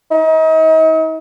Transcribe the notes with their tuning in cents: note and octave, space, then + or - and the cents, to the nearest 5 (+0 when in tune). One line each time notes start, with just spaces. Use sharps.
D#4 +40